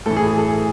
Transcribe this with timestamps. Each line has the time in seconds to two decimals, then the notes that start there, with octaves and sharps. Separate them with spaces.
0.06 A2 E3 A4
0.17 G#4
0.27 G#4
0.38 A4
0.48 G#4